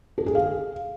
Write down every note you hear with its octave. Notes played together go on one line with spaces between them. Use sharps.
A4
G#4
F5